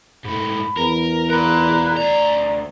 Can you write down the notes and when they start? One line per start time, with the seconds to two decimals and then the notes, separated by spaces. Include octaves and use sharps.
0.24 G#2 A3 B5
0.77 E2 A#4
1.30 A#4 D5 A#5 B5 F#6
1.97 D2 D5 A#5